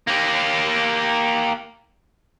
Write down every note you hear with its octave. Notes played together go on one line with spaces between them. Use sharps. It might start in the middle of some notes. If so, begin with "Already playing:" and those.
A#3 G4